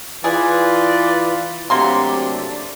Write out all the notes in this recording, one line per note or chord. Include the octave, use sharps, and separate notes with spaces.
E3 F4 G#4 B4 D5
C3 F#3 A3 A#3 D4 F#4 C6